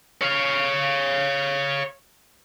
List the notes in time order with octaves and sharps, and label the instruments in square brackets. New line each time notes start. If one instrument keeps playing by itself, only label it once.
[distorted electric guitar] C#5 F5